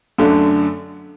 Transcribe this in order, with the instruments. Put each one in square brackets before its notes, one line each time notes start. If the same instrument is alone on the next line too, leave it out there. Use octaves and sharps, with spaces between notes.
[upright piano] F#2 D3 A3 D4